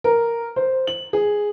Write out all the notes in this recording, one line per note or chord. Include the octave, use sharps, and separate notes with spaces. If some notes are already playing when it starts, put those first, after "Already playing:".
A#4
C5
F#7
G#4